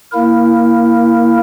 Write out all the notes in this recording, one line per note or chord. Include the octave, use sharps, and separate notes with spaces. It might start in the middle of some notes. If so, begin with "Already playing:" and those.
A#3 E4 A#4